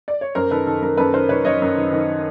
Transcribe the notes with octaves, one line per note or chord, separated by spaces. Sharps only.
D5
C#5
F#2 A#4 C5
D#3 A4 B4
D#3 A4
F#2 A#4
F#2 A4 B4
D#3 A#4 C5
D#3 B4 C#5
F#2 C#5 D#5
F#2
D#3
D#3